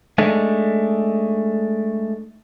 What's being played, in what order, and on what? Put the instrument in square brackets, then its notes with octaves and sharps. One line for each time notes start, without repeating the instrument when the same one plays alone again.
[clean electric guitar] G#3 A3 D4 D#4